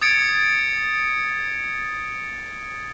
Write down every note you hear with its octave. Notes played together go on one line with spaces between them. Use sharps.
D#6 G#6 A6 C#7 D7